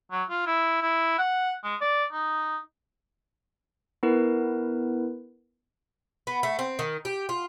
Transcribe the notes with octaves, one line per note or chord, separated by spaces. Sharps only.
F#3
F4
E4
E4
F#5
G#3
D5
D#4
B3 E4 A#4 B4
B3
A3
C4
D#3
G4
F4